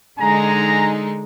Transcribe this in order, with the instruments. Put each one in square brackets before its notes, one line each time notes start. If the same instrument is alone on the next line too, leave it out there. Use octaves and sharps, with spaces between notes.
[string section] D3 G#3 D#4 [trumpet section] G#5 A#5